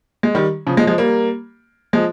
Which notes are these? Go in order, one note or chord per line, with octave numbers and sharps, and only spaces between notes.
G#3
D#3 G3
C#3 F3
F3 G#3
F3 G#3
G3 A#3
F3 G#3